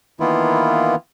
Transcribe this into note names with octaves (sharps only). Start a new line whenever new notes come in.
D#3 E3 A#3 B3 E4 F4